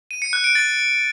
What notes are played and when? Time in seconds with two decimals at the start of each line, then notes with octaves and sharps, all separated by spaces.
0.11 D#7
0.22 C#7
0.33 F#6
0.44 D7
0.55 A6